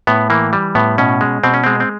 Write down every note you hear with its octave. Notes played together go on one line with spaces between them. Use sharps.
A2 B3
E3 A#3
G3
A2 B3
B2 C#4
G#3
B2 C4
C#4
G#3 C4
C4